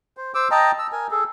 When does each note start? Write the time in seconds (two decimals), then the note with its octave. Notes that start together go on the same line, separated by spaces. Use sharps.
0.17 C5
0.34 C5 D6 E6
0.51 D#5 G5 A5 A#5
0.79 E6
0.92 A#4 G#5
1.11 G#4 A4